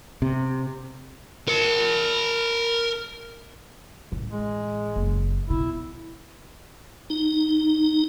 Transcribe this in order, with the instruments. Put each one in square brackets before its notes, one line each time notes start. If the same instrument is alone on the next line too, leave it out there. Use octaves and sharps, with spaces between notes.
[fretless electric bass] C3
[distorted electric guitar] A#4 A5
[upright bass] A1
[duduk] G#3
[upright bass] F#1
[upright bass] B2 [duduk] E4
[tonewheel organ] D#4